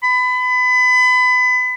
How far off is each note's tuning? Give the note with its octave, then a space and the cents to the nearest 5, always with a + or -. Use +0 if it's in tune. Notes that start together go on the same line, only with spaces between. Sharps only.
B5 +30